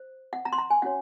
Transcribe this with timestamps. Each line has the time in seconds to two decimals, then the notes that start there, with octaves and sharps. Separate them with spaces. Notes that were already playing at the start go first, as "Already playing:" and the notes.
Already playing: C5
0.33 F#5
0.45 A#5
0.53 C6
0.58 A#5
0.70 G#5
0.82 C#4 F#4 C#5 F#5